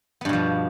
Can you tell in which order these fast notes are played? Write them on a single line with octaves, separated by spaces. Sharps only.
B3 G2 B2 F3